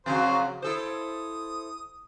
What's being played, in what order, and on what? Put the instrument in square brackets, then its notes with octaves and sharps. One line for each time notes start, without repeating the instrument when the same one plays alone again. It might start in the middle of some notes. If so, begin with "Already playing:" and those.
[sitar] F2 C#3 F#3 [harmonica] C5
[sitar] E4 A4 C5 [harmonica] D#6